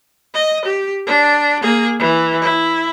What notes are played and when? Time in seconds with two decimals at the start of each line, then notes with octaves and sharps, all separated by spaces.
0.34 D#5
0.65 G4
1.07 D4
1.62 A#3 G#4
1.99 E3
2.41 E4